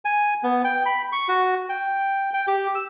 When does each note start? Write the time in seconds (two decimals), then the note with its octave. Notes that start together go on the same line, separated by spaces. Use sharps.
0.05 G#5
0.43 B3
0.64 G5
0.86 B5
1.12 C#6
1.29 F#4
1.69 G5
2.34 G5
2.48 G4
2.75 E6